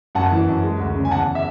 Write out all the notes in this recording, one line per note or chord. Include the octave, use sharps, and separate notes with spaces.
F#2 F#5 A5
E3
F#2
G#3
D2
C#3
G#5
E2 F#5 A5
E5